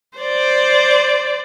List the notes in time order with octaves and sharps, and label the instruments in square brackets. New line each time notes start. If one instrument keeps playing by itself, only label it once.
[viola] C5 D5